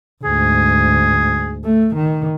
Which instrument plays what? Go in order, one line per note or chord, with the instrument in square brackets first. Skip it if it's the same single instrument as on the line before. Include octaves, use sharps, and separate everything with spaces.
[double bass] D2 G#2 [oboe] G#4
[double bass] A3
D#3